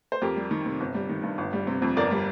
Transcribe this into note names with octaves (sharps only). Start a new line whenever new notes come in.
C5
F2 G4 A#4
G3
D#3
C3
G1
G3
D#3
G2
G1
G3
C3
F2
G1 A#4 D5
G3